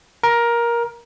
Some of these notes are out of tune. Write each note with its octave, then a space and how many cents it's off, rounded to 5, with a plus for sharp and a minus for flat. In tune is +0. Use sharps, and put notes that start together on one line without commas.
A#4 +15